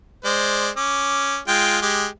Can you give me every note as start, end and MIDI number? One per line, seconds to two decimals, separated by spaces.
0.25 0.69 56
0.25 0.69 72
0.25 0.69 74
0.77 1.38 61
0.77 1.38 86
1.48 1.78 56
1.48 1.78 65
1.48 1.78 79
1.82 2.07 56
1.82 2.07 67